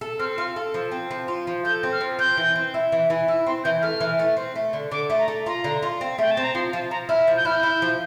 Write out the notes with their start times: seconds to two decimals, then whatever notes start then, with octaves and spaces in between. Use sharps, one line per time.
0.01 A4
0.19 C4 F6
0.38 F4 F6
0.56 A4
0.74 F3
0.92 C4
1.11 F3
1.28 F4
1.47 F3
1.65 A4 G6
1.83 C4
1.92 F6
2.01 F3
2.19 C4 G6
2.37 E3
2.55 C4
2.74 E4
2.92 E3
3.10 E3
3.28 E4 E6
3.46 C4 C6
3.64 E3 G6
3.82 A3 F6
4.00 E3
4.19 A3
4.37 C4
4.56 A3
4.73 D3
4.91 D3 D6
5.10 A3
5.19 A#5
5.28 A3
5.46 F4 A#5
5.64 D3
5.83 F4
6.01 C4
6.18 A3 G5
6.31 A5
6.37 C4
6.44 A#5
6.54 F3 C6
6.73 F3 A5
6.91 F3 A#5
7.09 E4 F6
7.27 F3
7.37 G6
7.45 E4 F6
7.56 G6
7.63 E4
7.82 F3